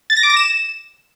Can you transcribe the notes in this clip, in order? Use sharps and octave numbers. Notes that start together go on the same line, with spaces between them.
A6
A#6
D6
A#6
E7